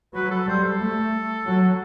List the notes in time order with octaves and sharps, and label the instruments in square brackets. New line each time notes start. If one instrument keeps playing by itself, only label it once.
[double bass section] F#3 [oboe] B4
[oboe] A4
[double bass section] G3 [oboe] C5
[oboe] A4
[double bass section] A3
F#3